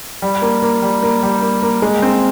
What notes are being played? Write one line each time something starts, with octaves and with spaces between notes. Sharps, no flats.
G3
A#3
A#3
G3
A#3
G3
A#3
A#3
G#3
C4